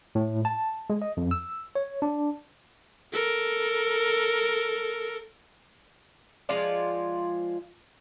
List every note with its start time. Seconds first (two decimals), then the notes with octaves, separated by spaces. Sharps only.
0.15 A2
0.45 A5
0.90 G#3
1.02 D#5
1.17 F2
1.31 E6
1.75 C#5
2.02 D4
3.13 A4 A#4
6.49 F3 G#3 F4 D5